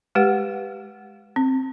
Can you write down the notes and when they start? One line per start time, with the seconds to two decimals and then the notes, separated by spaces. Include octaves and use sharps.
0.15 G#3 G4 B4 F#5
1.36 C4